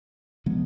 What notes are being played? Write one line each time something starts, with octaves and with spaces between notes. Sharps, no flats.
C3 F3 G#3 B3